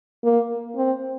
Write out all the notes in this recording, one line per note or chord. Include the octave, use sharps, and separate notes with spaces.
A#3
C4